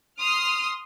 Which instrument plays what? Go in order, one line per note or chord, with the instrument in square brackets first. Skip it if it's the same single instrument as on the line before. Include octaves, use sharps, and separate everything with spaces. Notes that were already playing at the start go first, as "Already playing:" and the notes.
[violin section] C6 D#6 F6